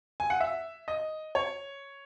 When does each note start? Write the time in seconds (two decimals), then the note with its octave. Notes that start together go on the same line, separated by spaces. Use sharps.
0.20 G#5
0.30 F#5
0.40 E5
0.88 D#5
1.35 C#5